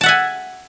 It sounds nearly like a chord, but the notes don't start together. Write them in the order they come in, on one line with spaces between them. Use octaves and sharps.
A5 F#5 E5 G#5